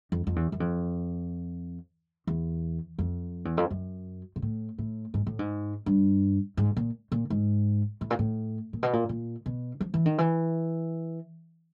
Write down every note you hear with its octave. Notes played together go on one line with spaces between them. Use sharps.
F2
F2
E2
F#2
F2
E2
F2
E2
F2
F#2
A#2
A2
A2
G#2
A2
G#2
G2
G#2
A#2
A#2
G#2
A2
A#2
A2
A#2
B2
A#2
A#2
B2
F3
E3
D#3
E3